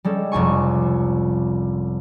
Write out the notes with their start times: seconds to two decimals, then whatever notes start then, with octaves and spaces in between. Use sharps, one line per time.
0.05 G3 G#3 C#4 A4
0.32 F1 C2 G#5 C#6